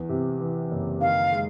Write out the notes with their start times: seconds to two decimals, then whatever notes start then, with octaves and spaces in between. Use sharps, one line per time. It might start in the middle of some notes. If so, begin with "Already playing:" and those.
Already playing: E2
0.09 C3
0.40 E3
0.71 F#1
1.01 D#3 F5
1.32 G#3